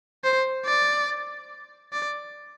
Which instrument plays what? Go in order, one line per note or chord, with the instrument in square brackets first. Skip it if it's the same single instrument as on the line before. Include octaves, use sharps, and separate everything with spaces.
[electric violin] C5
D5
D5